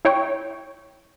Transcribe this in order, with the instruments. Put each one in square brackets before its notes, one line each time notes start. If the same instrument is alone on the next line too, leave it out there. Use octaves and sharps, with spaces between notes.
[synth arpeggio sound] E4 C#5 G5 C#6